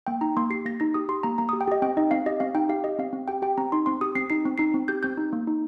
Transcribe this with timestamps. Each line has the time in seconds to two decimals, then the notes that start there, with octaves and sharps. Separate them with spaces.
0.07 A#3 G5
0.21 D#4 A#5
0.37 A#3 C6
0.50 G4 C7
0.65 A#3 A#6
0.80 D#4 A#6
0.94 G4 D#6
1.09 G4 C6
1.23 A#3 A#5
1.38 A#3 A#5
1.49 D#6
1.53 G4
1.61 G5
1.68 G4 D#5
1.82 C4 G5
1.97 D#4 D#5
2.11 C4 F5
2.26 G4 D#5
2.40 C4 F5
2.55 D#4 G5
2.69 G4 F5
2.84 G4 D#5
2.99 C4 F5
3.13 C4
3.28 G4 G5
3.42 G4 G5
3.58 C4 A#5
3.72 D#4 C6
3.86 C4 C6
4.01 G4 D#6
4.15 C4 C7
4.30 D#4 C7
4.45 C4
4.58 D#4 C7
4.74 C4
4.88 G4 G6
5.03 C4 G6
5.17 D#4
5.33 A#3
5.47 D#4